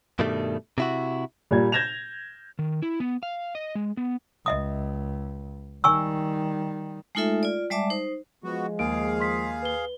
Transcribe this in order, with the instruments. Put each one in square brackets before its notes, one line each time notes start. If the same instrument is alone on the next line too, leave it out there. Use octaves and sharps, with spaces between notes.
[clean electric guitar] G2 B2 D#3 G3 A3
C3 E4 F#4
[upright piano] A#2 G3 G#6
G6 G#6 A#6 E7 F7
[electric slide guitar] D#3
E4
B3
F5
D#5
G#3
B3
[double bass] C#2 [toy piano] D#5 E5 D#6
[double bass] D#3 G3 [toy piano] G#5 C#6 E6
[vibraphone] G#3 A3 D#4 F4 A4 E5
F4 D5
G3 G#3 D5 E5 A5 D6
D#4 C5
[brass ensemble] F3 G#3 [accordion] B3 F#4
[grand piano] D#2 [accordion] G#4 F5 [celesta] D7
[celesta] C6 B6
B4 G7